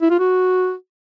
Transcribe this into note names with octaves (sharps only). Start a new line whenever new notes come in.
E4
F4
F#4